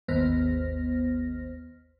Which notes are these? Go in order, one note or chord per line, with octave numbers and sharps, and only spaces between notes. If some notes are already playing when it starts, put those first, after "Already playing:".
G#1 D#2 B3 C5 F6 A#6